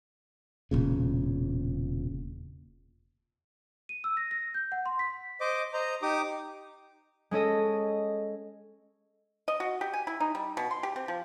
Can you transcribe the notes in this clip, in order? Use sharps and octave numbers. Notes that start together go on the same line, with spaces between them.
E1 A#2 C#3
D#7
E6
A#6
A#6
G6
F#5
C6
B6
C5 D#5 D6
C5 D#5 A#5
D#4 G4 D6 D#6
G#3 C#4 A4 D#5
D#5
F#4
G4
G#5
E4
D#4
G3
B2
C6
G4
C4
F3